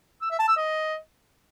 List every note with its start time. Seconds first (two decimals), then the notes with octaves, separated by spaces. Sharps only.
0.22 E6
0.31 E5
0.39 A5
0.48 E6
0.57 D#5